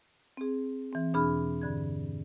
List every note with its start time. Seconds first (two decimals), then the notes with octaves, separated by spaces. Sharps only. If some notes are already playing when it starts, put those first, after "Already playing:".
0.37 C4 G#4
0.93 E3 C4
1.14 E2 B2 D4 G#4 B5 F6
1.62 G2 D3 G#6